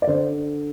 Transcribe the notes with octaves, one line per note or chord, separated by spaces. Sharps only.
D5
D3 C5